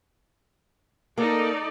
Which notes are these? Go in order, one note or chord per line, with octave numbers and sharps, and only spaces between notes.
A#3 D#4 A4 D5